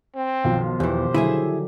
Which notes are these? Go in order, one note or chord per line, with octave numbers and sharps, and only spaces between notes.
C4
B1 D#3 F3 F4
E2 E3 G4 C5
D3 F#3 E4 G#4 E5